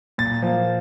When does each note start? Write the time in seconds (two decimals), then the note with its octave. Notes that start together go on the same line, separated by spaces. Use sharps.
0.18 A#2 A6
0.42 F3 A#3